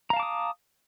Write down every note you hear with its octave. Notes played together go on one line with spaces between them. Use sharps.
F5 A5 A#5 D6 D#6